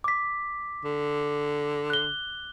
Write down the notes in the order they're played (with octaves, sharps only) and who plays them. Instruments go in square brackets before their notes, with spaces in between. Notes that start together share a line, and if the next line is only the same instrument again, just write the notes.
[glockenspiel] D6 B6
[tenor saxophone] D3
[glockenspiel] F#6 G7